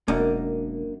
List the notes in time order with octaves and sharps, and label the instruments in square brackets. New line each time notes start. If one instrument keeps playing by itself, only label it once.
[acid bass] E1 [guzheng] F#2 [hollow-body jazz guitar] A#3 D4 D#4